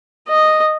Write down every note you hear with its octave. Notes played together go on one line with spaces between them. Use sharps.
D#5